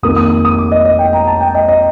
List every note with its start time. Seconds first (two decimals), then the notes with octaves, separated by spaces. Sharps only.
0.03 F2 D#3 A#3 D#6
0.16 D#6
0.30 D#6
0.45 D#6
0.58 D6
0.72 D#5
0.85 D#5
0.99 G5
1.13 A#5
1.27 A5
1.41 G5
1.55 D#5
1.68 D#5